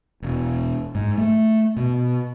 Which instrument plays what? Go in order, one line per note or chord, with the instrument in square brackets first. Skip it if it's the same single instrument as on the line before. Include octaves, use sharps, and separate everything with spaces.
[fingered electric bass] E1
G#2
A3
B2